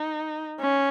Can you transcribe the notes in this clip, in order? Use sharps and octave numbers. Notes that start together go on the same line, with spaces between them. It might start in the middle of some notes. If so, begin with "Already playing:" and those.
Already playing: D#4
C#4